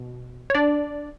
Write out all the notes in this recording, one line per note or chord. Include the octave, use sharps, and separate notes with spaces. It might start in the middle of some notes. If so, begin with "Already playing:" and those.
Already playing: B2
C#5
D4 D5